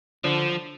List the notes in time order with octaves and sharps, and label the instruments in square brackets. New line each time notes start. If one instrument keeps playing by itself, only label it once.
[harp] D3 [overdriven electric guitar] F3